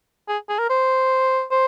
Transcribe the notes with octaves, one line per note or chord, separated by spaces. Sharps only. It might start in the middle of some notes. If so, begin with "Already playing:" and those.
G#4
G#4
A#4
C5
C5